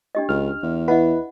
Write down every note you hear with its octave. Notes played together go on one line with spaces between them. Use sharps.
D4 G4 D#5
C#2 F6
E2
E4 B4 D#5 F#5